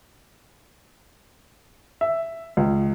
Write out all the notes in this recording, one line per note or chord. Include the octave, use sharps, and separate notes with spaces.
E5
C#2